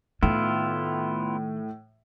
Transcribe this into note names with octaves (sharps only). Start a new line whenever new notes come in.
A2 D#3 B3 E4 F4